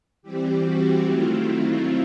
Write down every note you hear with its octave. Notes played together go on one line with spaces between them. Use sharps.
E3 G3 C4 G4
F#4
D#3 F#3 A3 C4 E4 F4
E4